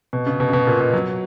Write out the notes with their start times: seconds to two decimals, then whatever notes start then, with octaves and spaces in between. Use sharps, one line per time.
0.13 B2
0.27 C#3
0.40 B2
0.49 C#3
0.53 B2
0.67 A#2
0.80 B2
0.93 F#3